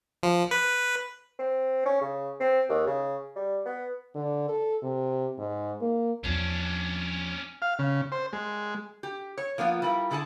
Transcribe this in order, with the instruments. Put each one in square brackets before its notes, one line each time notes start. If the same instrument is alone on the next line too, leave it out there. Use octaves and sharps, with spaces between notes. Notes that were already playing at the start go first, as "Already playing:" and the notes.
[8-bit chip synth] F3
B4
[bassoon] C4
C#4
C#3
C4
D#2
C#3
G3
B3
[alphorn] D3
A4
C3
G#2
A#3
[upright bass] E2 F3 [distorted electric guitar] C#4 D4
[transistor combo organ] F5
C#3
C5
G#3
[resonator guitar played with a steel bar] G4
C#5
F3 A#3 B3 F4
G3 E4 F4 A#4
D3 E4 G#4 D5 A5